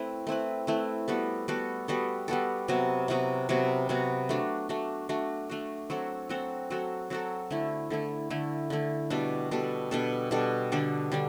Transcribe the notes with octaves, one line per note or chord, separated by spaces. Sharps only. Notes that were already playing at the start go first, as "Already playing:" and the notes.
Already playing: A3 C4 E4 B4
A3 C4 E4 B4
A3 C4 E4 B4
G3 B3 F#4 A4
G3 B3 F#4 A4
G3 B3 F#4 A4
G3 B3 F#4 A4
C3 F#3 B3 F#4
C3 F#3 B3 F#4
C3 F#3 B3 F#4
C3 F#3 B3 F#4
A3 D4 F#4
A3 D4 F#4
A3 D4 F#4
A3 D4 F#4
F#3 C4 F#4 A4
F#3 C4 F#4 A4
F#3 C4 F#4 A4
F#3 C4 F#4 A4
D3 A3 E4
D3 A3 E4
D3 A3 E4
D3 A3 E4
B2 G3 D4 A4
B2 G3 D4 A4
B2 G3 D4 A4
B2 G3 D4 A4
D3 G3 D4 A4
D3 G3 D4